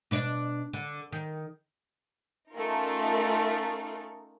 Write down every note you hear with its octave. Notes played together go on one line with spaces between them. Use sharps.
B2 D4 D5
D3
D#3
A3 C#4 D#4 F4 A#4